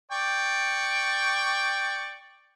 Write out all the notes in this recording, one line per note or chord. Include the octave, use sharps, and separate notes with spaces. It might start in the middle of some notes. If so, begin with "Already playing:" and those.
D5 G5 C#6